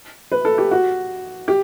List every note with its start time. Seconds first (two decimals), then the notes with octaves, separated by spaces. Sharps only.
0.32 B4
0.45 A4
0.58 G4
0.71 F#4
1.48 G4